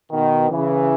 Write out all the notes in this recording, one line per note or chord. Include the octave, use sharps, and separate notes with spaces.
B2 D#3
C#3 E3